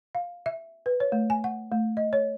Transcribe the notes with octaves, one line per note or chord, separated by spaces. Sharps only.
F5
E5
B4
C#5
A3
G#5
F#5
A3
D#5
C#5